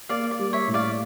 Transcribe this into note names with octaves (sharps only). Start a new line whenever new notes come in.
A#3 D5 F5
D5
G3
C#5 E5
A2
D5 F5